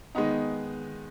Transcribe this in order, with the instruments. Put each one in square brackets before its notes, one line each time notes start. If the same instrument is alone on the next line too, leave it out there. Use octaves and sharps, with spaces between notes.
[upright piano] D#3 G#3 B3 D#4